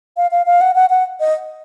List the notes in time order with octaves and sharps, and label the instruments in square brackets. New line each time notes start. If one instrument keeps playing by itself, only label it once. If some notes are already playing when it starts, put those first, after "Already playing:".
[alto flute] F5
F5
F5
F#5
F#5
F#5
D#5